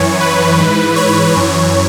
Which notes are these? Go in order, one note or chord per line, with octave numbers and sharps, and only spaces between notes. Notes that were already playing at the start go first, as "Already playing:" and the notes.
Already playing: F#2 E3 C#5
B4
G#2 E3
C#5
F#2 E3